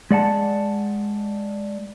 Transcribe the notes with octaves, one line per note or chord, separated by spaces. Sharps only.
G#3 D5 F#5 A5